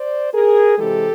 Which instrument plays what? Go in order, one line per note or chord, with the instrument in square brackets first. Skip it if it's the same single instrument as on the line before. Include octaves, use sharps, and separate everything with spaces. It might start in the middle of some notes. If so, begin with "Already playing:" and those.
Already playing: [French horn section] C5 D5
G#4 A#4
C3 E3 G#3 G4 A4